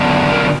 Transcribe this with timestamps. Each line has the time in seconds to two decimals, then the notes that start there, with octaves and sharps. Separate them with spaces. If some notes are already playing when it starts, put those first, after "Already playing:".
Already playing: D3 F#3 B3 D4
0.32 A#4